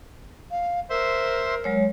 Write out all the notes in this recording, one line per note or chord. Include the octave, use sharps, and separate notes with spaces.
F5
A#4 C5 E5 C6
F#3 G#3 C#5